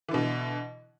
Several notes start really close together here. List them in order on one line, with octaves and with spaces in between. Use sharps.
E3 D3 B2